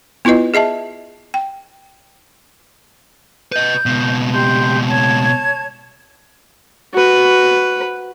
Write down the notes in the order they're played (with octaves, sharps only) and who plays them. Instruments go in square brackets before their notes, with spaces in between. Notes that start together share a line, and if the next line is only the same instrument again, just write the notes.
[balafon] B3 E4 F4 B4 D#5
G#4 D#5 E5 A5
G5
[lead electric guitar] B4 D#5 [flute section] G6
[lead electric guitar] C#2 B2
[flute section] G4 C6 G6
C#5 A5 G#6
[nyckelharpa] F#4 B4